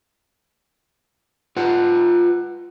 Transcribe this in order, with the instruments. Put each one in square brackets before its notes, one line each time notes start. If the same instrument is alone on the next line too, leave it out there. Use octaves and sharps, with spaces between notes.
[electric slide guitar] F4 B4 F#5